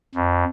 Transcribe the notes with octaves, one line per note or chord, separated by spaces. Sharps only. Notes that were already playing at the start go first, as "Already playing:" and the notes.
F2